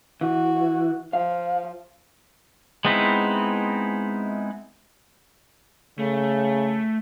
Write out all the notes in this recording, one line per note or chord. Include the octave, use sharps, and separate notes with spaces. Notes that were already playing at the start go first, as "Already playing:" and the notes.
E3 F#4
F3 F5
G#3 B3 C4 D#4 E4
C#3 A3